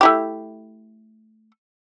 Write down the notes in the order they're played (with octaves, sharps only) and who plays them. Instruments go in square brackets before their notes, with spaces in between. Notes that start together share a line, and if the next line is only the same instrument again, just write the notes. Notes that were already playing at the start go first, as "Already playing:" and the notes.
[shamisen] A3 E4 G4